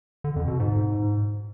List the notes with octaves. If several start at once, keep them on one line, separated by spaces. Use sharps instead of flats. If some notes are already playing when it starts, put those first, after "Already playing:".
D3
F2
B2
G#2